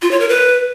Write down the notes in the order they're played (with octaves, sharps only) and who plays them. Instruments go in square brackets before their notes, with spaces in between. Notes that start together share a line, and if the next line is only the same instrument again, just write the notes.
[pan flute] F4
C#5
A#4
B4